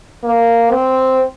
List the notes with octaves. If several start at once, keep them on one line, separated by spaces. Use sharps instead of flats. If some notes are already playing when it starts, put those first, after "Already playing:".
A#3
C4